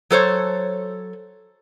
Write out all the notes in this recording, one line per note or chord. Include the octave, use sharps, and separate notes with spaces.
F#3 A4 C5 C#5